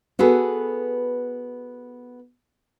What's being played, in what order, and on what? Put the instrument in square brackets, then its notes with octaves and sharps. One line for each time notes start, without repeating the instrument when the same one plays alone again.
[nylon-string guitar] B3 F#4 G#4 A4 B4